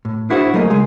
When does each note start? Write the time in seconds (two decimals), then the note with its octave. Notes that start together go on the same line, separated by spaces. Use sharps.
0.05 A2
0.30 D4 E4 F#4 G#4 A4 C5
0.54 F#3 A3 A#3 G#4 D#5
0.70 C#3 G#3 G#4